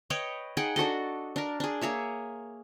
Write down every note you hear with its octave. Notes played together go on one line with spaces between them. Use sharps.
B4 C#5 D#5 G5
D#4 G#4 F#5 G5
D4 F#4 A4 D#5
D4 A#4
D4 G#4
A#3 G#4 C#5 E5